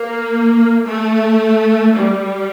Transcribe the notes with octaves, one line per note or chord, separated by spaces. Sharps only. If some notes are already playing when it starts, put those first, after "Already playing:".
Already playing: A#3
A3
G3